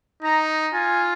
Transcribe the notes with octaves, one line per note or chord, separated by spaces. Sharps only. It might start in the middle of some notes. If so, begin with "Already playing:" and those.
D#4 A#5
F4 G#5